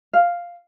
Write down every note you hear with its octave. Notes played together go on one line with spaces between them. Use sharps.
F5